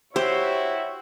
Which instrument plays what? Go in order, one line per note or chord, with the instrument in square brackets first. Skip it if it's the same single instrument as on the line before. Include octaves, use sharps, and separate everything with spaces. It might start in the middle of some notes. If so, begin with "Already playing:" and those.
[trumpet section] E4 F#4 E5 [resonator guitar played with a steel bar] G4 [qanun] C5 [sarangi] C#5